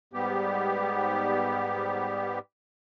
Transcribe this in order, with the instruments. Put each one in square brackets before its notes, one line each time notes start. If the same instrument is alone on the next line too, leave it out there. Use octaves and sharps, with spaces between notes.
[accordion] G#2 G3 B3 G4